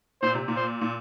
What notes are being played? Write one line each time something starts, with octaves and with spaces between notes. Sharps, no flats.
A#2 C5
C3
A#2
C5
A#2